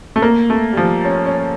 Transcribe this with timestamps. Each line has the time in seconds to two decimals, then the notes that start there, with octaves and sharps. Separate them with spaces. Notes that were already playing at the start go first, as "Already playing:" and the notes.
0.16 A3
0.22 A#3
0.50 A3
0.73 G3
0.77 F3
1.05 C#4
1.26 C#4